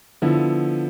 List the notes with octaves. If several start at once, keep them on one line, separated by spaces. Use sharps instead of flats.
D3 F3 B3 E4